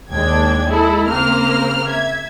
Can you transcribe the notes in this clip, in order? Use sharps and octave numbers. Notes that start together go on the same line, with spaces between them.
D#2 G#3 D4 G5 G#6
G#3 E4 A4
C#3 A#3 C4 A#4 C5 F6
E5 G#6